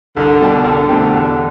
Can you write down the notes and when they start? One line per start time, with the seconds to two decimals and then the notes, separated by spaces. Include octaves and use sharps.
0.16 C2 D3
0.41 B2 G3
0.64 C2 D3
0.89 B2 A3 C4 G4
1.13 E2